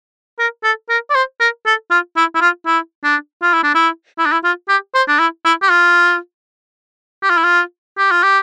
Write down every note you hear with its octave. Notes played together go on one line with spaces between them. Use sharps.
A#4
A4
A#4
D5
C5
A#4
A4
F4
E4
E4
F4
E4
D4
F4
E4
D4
E4
E4
D4
E4
F4
G4
C5
D4
E4
E4
G4
F4
G4
F4
E4
F4
G4
F4
G4